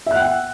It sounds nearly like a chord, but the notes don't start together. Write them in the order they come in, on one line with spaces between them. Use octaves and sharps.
E5 F#6 F#5 G5